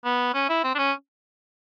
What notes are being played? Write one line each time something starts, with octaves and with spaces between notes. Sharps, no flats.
B3
C#4
E4
C4
D4
C#4